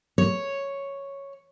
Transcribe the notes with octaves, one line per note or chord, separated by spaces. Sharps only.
C#5